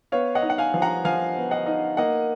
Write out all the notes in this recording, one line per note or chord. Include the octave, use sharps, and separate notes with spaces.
B3 C#5 F5
D#5 F#5
D#4
F#5
F5 G#5
F3
F#5 A#5
F3 F5 G#5
B3
D#5 F#5
D#4
A#3 D#5 F#5